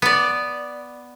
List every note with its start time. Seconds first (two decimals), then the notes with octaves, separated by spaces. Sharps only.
0.02 B3 D5